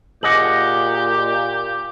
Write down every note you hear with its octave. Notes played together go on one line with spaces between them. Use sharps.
A#2 G4 G#4 D#5 F#5 D6 F#7